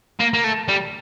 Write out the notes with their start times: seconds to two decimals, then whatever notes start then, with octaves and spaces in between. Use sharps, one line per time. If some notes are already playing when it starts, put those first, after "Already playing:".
0.19 A#3
0.33 A#3
0.44 A3
0.68 G3